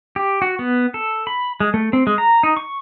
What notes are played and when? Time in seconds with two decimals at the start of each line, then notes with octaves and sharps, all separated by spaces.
0.16 G4
0.42 F#4
0.59 B3
0.94 A4
1.27 B5
1.60 G#3
1.74 A3
1.93 C4
2.07 G#3
2.18 A#5
2.43 D#4
2.57 C#6